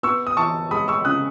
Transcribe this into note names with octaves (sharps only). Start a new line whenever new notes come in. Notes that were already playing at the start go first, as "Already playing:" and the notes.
B3 C#6 E6
D#6
E3 A5 C#6
G#3 B5 D#6
C#6 E6
C#3 D#6 F#6